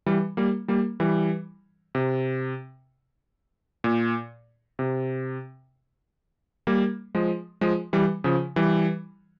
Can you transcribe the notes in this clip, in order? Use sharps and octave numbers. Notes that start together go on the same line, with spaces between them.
E3 G3
G3 A#3
G3 A#3
E3 G3
C3
A#2
C3
G3 A#3
F3 G#3
F3 G#3
E3 G3
C#3 F3
E3 G3